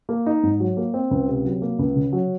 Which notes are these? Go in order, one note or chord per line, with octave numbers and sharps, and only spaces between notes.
A#3
D#4
G#2
F#3
A#3
C4
C#2
C3
F#3
A#3
C#2
C#3
F#3